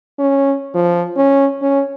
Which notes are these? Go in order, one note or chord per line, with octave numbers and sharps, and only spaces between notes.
C#4
F3
C#4
C#4